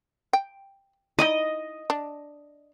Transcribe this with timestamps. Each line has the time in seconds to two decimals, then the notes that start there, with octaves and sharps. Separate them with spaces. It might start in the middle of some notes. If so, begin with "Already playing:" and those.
0.33 G5
1.19 D#4 E4 D5 D#5
1.90 D4